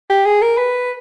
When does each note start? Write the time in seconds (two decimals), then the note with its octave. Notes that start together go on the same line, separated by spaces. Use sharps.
0.10 G4
0.26 G#4
0.42 A#4
0.58 B4